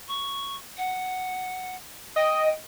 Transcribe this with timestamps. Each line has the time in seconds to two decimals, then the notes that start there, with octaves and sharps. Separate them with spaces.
0.08 C#6
0.77 F#5
2.16 D#5 G5